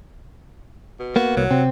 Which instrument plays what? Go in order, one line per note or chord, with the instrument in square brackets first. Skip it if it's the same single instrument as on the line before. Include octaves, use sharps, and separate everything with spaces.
[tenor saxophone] B2
[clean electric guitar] A#3 B3 [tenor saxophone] F#4
[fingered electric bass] C2 [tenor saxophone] F#3
[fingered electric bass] C3 [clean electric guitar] C4